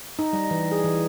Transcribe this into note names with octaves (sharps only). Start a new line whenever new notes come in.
D#4
G3
E3
G#4
E3